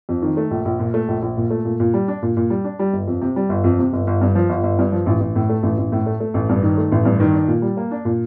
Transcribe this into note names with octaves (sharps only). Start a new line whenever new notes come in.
F2
D#3
A3
A#1
A#1
A#2
A3
A#1
A#1
A#2
A3
A#2
A#2
G3
D4
A#2
A#2
G3
D4
G3
G1
F2
C3
G3
G1
F2
C3
G1
G1
G2
F3
G1
G1
G2
F3
A1
A1
A2
A3
A1
A1
A2
A3
A3
A1
G2
D#3
A3
A1
G2
D#3
D4
A#2
G3
A#3
D4
A#2